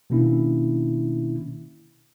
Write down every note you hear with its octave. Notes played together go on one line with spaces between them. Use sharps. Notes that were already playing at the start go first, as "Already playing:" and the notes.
B2 D#3 A#3 C#4 D4 E4